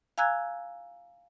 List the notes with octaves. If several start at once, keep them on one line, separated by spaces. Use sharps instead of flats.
F5 G#5 A#5 E6 F#6 G#6